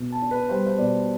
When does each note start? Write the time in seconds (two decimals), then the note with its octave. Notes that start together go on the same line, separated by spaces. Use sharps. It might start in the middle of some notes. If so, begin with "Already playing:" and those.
Already playing: B2
0.12 A5
0.22 D4
0.31 B4
0.49 G3 C5
0.67 C5
0.78 B2 D5